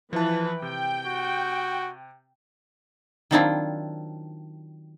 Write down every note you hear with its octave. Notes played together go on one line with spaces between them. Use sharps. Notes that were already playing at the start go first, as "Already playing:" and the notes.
E3 F3 B4 A5
C3 G5
F#4
D#3 F#3 C4 D4 E4 F4